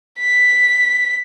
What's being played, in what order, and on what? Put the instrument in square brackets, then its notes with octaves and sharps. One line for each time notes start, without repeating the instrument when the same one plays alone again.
[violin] B6